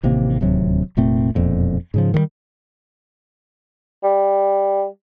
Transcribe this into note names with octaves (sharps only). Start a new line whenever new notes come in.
A1 C3 D#3 A#3
D1 D#2 C3 F#3
F1 A#2 A3 C4
E1 F2 A#2
G#2 C#3 F3
D#3 E3 G3
G3